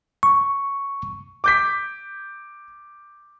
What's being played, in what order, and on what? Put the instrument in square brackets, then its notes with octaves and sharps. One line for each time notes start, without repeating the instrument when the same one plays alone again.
[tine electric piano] C#6
[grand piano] D6 G6 B6